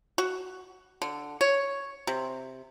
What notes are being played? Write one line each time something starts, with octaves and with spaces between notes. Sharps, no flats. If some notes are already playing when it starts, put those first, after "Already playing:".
F#4
D3
C#5
C3